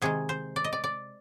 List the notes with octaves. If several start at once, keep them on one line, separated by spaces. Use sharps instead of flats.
C3 D#3 G#3 G#4
C5
D5
D#5
D5
D5